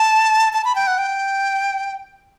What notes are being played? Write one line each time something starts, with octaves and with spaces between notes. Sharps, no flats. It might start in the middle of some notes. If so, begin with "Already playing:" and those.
Already playing: A5
A5
B5
G5
F#5
G5